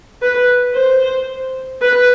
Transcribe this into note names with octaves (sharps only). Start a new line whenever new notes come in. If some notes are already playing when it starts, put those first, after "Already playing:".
B4
C5
B4